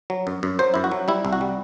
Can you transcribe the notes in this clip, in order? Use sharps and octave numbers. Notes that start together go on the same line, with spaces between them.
F#3
F#2
F#2
F#3 C5
F#2 E4
F#4
F#3
G3 E4
C2
F#4
G3